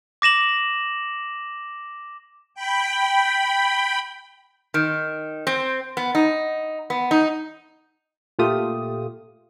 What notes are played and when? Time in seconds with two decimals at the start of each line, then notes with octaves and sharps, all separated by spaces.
0.22 D6 A#6 E7 F#7
2.54 G5 B5
4.74 D#3
5.47 C4
5.97 B3
6.15 D#4
6.90 B3
7.11 D#4
8.39 A#2 A3 F4 G4 D#6